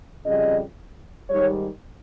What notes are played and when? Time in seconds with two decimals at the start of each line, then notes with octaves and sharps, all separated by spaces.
0.25 F2 C#3 G3 D#5
1.30 G#2 D#3 G3 C#5